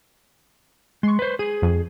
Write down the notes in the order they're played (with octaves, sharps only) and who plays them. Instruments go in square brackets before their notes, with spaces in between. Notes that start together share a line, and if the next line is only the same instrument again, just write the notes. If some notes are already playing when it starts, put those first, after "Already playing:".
[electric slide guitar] G#3 [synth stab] C6 C#6
[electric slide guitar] B4 C5
[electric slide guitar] G#4 [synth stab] D#7
[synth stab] F2